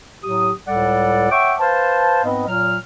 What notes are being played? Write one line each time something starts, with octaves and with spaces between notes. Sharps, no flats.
A2 F#3 G4 D#6
C#2 A2 G3 A4 D5 F#5
C#5 E5 F#5 G5 C#6 D6
B4 C5 F5 A5
G#2 B3 C4 B4 D#5
A#2 F#3 F6